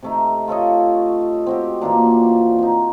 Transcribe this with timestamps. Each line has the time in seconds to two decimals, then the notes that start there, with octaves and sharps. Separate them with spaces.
0.02 C3 A3 D#4
0.48 F4 A4 C#5 D#5
1.46 C4 F#4 G4
1.81 A#2 E3 A#3 D4
2.58 C4 D#4